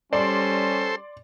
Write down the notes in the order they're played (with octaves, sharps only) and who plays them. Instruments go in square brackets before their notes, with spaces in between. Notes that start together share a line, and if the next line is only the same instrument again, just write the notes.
[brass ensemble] G3 C#4 [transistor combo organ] A4 C5 [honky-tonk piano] D5 C6